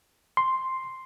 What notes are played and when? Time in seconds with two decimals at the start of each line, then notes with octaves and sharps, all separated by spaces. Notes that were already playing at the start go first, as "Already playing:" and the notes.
0.37 C6